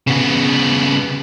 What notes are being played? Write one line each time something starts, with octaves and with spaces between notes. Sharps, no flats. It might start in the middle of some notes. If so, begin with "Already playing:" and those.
C#3 B3